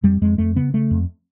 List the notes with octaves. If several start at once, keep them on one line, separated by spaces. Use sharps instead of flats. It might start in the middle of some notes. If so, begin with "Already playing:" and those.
F2 G3
F2 G#3
F2 A3
C#3 B3
C#3 A3
F2